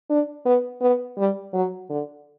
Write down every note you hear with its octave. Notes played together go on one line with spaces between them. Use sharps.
D4
B3
B3
G3
F#3
D3